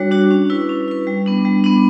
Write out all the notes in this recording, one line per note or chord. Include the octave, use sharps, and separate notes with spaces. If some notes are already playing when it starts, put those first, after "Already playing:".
Already playing: G3 D4 F#4 C#5
D4 F#4 C#5
C#4
E4 B4
C#4
E4 B4
G3
B3 D4
G3
B3 D4